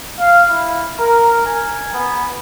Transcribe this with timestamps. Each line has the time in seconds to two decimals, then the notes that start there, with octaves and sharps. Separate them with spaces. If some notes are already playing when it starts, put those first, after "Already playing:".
0.19 F5
0.50 E4
1.00 A#4
1.46 G#5
1.93 B3